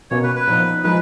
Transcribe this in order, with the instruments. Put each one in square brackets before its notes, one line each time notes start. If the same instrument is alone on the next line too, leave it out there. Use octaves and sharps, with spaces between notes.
[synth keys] B2 A#3 C#4 [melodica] C#5
[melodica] B4
B4
[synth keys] A#2 F3 B3 D#4
[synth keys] F3 G#3 D#4 [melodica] B4